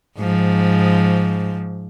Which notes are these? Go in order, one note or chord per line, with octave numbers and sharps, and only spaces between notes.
G#2 F3